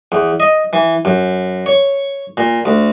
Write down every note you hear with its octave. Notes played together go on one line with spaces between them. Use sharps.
E2
D#5
E3
F#2
C#5
A#2
D2